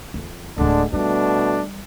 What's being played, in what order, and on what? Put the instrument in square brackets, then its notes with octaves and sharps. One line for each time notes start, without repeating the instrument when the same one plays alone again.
[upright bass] F2
[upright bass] D1 F#3 [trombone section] D3 G#3 D4
[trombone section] B2 A3 D4 [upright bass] G3